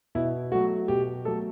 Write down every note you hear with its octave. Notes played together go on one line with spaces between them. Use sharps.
B2 E4
F#3 A3 F#4
B2 G4
F#3 A3 A4